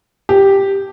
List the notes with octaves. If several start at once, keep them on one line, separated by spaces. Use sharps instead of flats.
G4